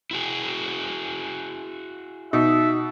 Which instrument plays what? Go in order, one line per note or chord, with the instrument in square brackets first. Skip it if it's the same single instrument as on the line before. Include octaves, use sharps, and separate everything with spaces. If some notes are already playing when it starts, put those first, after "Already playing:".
[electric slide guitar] E4 F#4 G#4
[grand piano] B2 [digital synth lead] D#4 [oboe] E5